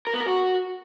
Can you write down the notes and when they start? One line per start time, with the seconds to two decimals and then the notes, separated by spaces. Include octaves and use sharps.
0.07 A#4
0.14 B3
0.21 A#4
0.27 F#4